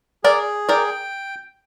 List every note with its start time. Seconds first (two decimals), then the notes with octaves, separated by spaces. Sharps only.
0.24 G#4 A#4 D5
0.69 A#4 D5 G5